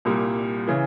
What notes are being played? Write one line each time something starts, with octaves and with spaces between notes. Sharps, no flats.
C2 A#2 G3
C#3 E3